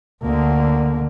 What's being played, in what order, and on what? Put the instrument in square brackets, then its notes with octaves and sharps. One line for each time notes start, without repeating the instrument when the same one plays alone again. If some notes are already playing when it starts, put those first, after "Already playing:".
[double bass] D2 D3 [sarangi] A#3